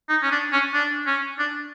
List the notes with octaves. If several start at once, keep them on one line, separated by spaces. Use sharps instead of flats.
D#4
C#4
D4
C#4
D4
C#4
D4